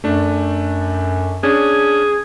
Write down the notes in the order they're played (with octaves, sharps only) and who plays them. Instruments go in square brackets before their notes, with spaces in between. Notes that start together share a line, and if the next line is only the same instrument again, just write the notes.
[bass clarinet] F#2 [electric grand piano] A3 D4
[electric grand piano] C#4 D4 [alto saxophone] G#4